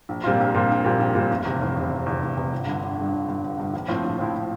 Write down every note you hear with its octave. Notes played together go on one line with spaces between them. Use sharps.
A#1
A#2 G3 C4 F4
A#1
A#2 G3 C4 F4
A#1
A#2 G3 C4 F4
A#1
A#2 G3 C4 F4
F1
E2 C3
F1
E2 C3
F1
E2 C3
F1
E2 C3
G1
G2 D3
G1
G2 D3
G1
G2 D3
G1
G2 D3
A#1
A2 F3 C4 E4
A#1
A2 F3 C4 E4